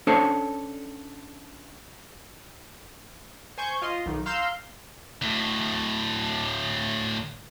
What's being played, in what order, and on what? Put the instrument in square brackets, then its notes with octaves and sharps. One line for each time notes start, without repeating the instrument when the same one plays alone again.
[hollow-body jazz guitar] C#4 D4 A4 C5 C#5
[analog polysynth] C5 G#5 C#6 G6
F4 D#5 C6
B1 D#3
F5 A#5 C6 E6 F6 G6
[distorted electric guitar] D2 A2